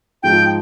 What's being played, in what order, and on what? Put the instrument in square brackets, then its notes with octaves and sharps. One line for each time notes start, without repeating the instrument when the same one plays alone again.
[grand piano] G#2 F3 G#3 D#4 [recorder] G5